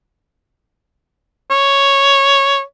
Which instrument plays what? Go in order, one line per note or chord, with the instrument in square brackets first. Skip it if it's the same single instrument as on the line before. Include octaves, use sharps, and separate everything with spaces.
[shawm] C#5